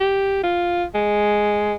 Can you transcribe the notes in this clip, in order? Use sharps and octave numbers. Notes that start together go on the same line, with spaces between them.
G4
F4
G#3